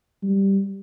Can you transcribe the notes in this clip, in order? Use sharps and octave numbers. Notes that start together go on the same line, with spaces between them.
G3